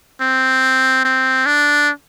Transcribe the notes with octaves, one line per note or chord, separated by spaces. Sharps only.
C4
C4
D4